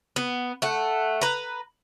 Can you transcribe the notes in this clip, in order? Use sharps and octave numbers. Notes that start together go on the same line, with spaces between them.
B3
A3 F#5
B4 A#5